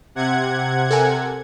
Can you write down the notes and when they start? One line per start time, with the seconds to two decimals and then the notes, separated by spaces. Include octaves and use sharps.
0.15 C3 F#5 G#6
0.91 A4 A#4 G#5